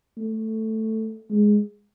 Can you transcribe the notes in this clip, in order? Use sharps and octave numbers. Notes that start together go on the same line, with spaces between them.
A3
G#3